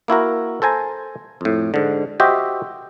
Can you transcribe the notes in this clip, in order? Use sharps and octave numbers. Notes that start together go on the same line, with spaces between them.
A#3 E4 F#4 A#4
A4 C5 G#5 A#5
F2 A2
G#2 D3
F#4 G4 C5 D#5 E5 G5